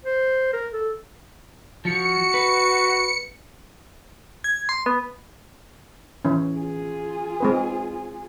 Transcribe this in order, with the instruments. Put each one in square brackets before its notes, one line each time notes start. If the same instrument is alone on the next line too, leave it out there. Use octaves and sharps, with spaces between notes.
[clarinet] C5
A#4
A4
[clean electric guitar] F3 [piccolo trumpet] F#4 [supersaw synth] C#7
[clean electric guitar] B4
[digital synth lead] G#6
C6
B3
[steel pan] E3 C#4
[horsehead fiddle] F4 G#4
[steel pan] G#3 C4 B4